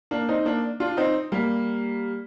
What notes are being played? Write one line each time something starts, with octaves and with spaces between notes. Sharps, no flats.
A#3 D4
C4 D#4
A#3 D4
D4 F4
C4 D#4
G3 A#3